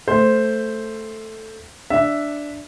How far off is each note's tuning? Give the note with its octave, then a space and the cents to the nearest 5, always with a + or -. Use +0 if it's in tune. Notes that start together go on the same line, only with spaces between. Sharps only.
A3 +0 C5 +0
D4 +0 E5 +0